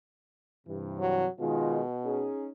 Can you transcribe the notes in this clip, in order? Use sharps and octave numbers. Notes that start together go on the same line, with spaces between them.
G2 C3 E3
F#3
B2 D#3 G#3 F4
C#4 D#4 G#4